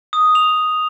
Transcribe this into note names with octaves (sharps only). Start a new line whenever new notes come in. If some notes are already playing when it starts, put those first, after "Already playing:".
D#6
F7